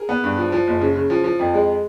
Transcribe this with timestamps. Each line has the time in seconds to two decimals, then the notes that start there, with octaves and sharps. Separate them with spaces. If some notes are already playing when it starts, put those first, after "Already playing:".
Already playing: G#4 A#4
0.09 B3
0.24 G2
0.37 F3
0.52 F3
0.67 F#1
0.81 C#3
0.96 C#3
1.10 F3
1.24 F3
1.39 F2
1.54 G#3